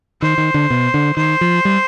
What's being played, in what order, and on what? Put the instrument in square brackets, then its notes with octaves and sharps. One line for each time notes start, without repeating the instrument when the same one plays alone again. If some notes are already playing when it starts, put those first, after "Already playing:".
[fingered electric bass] D#3 [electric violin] C5
[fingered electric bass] D#3
D3
B2
D3
[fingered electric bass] D#3 [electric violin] C5
[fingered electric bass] F3
G3